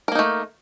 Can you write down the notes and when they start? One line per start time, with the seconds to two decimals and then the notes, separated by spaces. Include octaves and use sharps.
0.08 A#4
0.12 A#3
0.15 D#4
0.19 A3